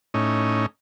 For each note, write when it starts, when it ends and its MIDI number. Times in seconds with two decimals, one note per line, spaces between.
0.14 0.66 45
0.14 0.66 61
0.14 0.66 63